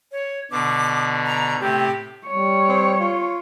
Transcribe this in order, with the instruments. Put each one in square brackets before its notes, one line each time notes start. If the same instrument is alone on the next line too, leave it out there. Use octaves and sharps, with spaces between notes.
[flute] C#5
[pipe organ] B2 D3 [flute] D6
[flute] A#5
[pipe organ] A2 C3 [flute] G4
[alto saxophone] G3 [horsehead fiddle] C#5
[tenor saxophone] C4
F4